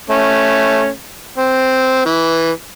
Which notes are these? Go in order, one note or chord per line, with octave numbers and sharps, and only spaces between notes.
A3 C#4
C4
E3